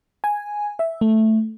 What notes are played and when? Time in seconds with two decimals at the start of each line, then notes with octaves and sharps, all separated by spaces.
0.24 G#5
0.79 E5
1.01 A3